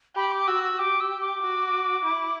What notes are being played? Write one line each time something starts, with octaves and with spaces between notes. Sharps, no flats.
G4 B5
D6
F#4 E6
E6
G4 D6
E6
D6
F#4
E4